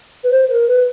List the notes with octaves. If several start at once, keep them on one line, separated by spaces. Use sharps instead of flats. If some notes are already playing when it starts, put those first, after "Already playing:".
B4
C5
A#4
B4